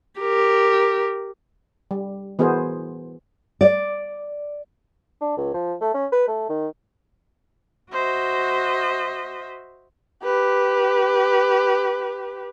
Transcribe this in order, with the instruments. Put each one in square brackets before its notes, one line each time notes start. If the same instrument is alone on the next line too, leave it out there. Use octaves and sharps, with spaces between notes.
[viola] G4 A#4
[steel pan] G3
E3 B3 F#4 G#4 A#4 C5
[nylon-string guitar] D5
[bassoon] D4
C#2
F3
A3
C#4
B4
A3
D#3
[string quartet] F#4 C5 D#5 E5
[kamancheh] G4 B4